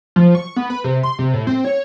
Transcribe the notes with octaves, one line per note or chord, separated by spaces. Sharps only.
F3
C#6
B3
B4
C3
C6
C3
A2
C4
C#5